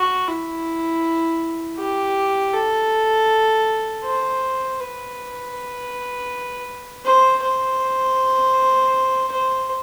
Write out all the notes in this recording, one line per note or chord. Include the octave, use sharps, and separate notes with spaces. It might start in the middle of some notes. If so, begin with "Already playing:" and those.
Already playing: F#4
E4
G4
A4
C5
B4
C5
C5
C5